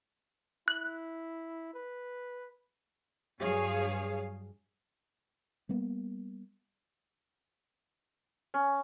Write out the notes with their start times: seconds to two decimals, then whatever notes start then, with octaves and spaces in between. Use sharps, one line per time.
0.68 E4 F#6
1.74 B4
3.41 G2 F#3 G#4 C#5 F5
5.69 G3 A#3 B3
8.54 C#4